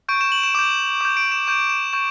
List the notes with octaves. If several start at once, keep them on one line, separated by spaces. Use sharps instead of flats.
C#6 G6 D7
E7
F#7
E7
D6 G6 E7
D6 G6 E7
D7
E7
C#6 G6 E7
E7
C#6 G6 E7